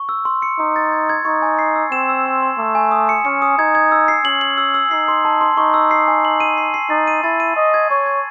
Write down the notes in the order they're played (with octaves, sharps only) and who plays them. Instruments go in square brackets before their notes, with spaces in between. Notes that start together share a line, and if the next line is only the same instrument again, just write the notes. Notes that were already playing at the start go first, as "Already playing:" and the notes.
Already playing: [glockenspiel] C#6
E6
C6
C#7
[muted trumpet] D#4 [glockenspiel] C6
[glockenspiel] A6
G#6
G#6
[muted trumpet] D#4 [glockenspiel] C#6
[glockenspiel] G#5
C7
E6
[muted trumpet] C4 [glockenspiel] E7
[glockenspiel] E6
C6
C6
[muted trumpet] A3 [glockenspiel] D#6
[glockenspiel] G#5
D#6
C#7
[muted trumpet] C#4 [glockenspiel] C#7
[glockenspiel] D#6
[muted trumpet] D#4 [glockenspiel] G#6
[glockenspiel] G#6
E6
C7
[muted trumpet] C#4 [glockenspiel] F#7
[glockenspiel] F#7
E6
E6
[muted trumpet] D#4 [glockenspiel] C7
[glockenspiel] C6
A5
C6
[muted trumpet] D#4 [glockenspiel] C#6
[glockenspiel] E6
C7
G#5
F#7
D#7
C7
C7
[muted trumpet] D#4 [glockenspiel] A6
[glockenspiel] D#7
[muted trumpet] E4 [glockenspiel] A6
[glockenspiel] D#7
[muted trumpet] D#5 [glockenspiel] C#6
[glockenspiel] G#6
[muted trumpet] C#5 [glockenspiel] C#6
[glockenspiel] G#6